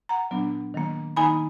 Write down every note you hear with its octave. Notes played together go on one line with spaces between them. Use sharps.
F#5 A#5
A#2 F#3 B3 D4
D#3 F#3 A#3
D#3 A#3 D#4 G#5 B5